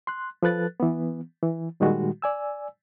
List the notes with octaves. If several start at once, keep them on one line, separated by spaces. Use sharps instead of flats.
C6 F#6
F3 A4 B4 F#6 A6
E3 B3
E3
A#2 D#3 G3 G#3 F#4
D5 G#5 E6